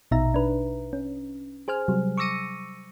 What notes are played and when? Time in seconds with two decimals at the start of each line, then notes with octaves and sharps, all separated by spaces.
0.11 A#1 B2 D#4 E5 A#5
0.34 D4 B4
0.93 C#4
1.68 G#4 C5 G#5 F6
1.88 C3 F#3 G3
2.18 C#6 D6 E6 A#6 C#7 D#7